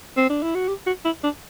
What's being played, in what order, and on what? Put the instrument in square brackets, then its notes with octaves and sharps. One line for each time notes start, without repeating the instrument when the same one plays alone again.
[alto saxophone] C4
D4
E4
F#4
G4
F#4
E4
D4